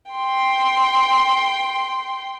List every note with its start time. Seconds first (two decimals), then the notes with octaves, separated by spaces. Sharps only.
0.12 G5 C6